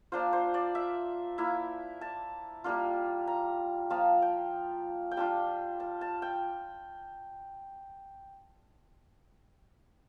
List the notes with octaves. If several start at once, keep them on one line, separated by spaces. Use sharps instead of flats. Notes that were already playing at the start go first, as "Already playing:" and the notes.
A#3 D4 F4 C5
C5
D5
E5
A#3 E4
A5
G3 A#3 D4 F4
A#5
F3 A#3 F4 A5
G5
G5
G3 D4 F4 A5
A5
A5
G5